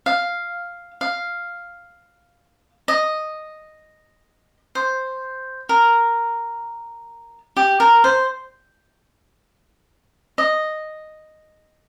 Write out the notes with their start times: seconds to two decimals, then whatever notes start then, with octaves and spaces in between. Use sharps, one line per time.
0.06 F5
1.01 F5
2.88 D#5
4.75 C5
5.69 A#4
7.57 G4
7.80 A#4
8.04 C5
10.38 D#5